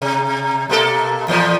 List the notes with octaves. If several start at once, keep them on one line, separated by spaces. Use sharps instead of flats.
C3
B2 A#3 A4
E2 A#2 F3